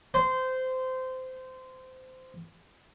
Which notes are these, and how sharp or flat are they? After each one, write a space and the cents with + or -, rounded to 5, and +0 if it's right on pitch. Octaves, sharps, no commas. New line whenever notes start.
C5 -20